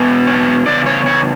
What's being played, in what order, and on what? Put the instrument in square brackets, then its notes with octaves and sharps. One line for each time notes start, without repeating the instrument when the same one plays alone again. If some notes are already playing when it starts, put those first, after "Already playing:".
Already playing: [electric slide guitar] E2 B2
C#5
E2 C#3 D5
C#5
C#5